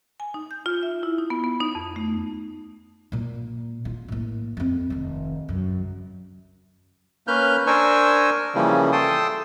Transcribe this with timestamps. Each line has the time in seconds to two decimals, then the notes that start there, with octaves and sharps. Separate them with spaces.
0.20 G#5
0.34 D#4
0.51 G6
0.66 F4
0.83 E5
1.03 E4
1.18 D#4
1.30 B3
1.44 B3
1.60 D#4
1.75 F2
1.96 A3
3.12 A#2 A#3
3.85 F4
4.08 A2 A#3
4.57 F2 C4
4.90 F1 D#3
5.49 F#2 C#3
7.27 A#3 C#4 B4 F6 G6
7.67 D4 A#4 C5 G#5 C#6 E6
8.55 C#3 E3 F3 G3 A#3 C#4
8.92 A4 G5 A5 C6 D#6